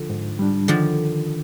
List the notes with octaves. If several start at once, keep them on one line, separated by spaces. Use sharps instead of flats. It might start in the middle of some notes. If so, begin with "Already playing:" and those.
Already playing: D3 F3
G#2
G3 D4
D3 D#3 F3